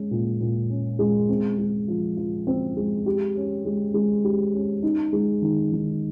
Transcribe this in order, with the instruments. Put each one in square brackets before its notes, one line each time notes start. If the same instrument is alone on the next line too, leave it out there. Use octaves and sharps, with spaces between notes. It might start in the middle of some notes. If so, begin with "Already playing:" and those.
Already playing: [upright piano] G#3 C#4
A#2
A#2
C#4
G#3
C4
G#3
F3
F3
C4
G#3
G4
C#4
G#3
G#3
G4
C#4
D#4
G#3
D#3
D#3